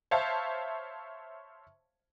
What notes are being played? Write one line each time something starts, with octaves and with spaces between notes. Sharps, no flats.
C5 C#5 E5 F5 A5